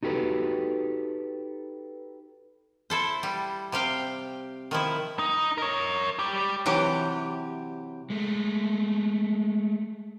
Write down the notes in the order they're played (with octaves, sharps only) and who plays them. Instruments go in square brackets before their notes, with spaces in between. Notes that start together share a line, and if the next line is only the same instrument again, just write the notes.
[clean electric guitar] D#4 F#4 G4 A4 B4
[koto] E4 A4 C5
G3
C3 G4 F5 G5
D#3 F3 E4
[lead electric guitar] D#4
A#4 C#5
G3 G4
[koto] C3 E3 F#3 G4
[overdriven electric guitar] G#3 A3